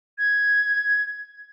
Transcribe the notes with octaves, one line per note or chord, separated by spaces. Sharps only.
G#6